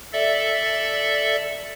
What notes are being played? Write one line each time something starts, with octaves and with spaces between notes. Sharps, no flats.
A4 D5 E5